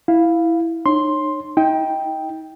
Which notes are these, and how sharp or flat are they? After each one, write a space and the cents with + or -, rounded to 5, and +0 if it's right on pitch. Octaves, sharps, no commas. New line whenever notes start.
E4 +0 F5 +0
D#4 -40 C#5 -20 C6 +5
D#4 +35 G5 +0